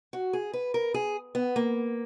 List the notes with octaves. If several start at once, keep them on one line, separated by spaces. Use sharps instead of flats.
F#4
G#4
B4
A#4
G#4
B3
A#3